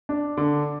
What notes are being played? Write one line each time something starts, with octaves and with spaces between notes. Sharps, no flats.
D4
D3